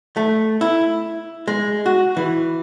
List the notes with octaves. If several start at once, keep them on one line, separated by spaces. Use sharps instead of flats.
A3
E4
G#3
F#4
E3